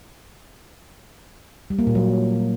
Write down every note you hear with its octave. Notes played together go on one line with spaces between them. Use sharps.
G3
A#3
A#2
F#3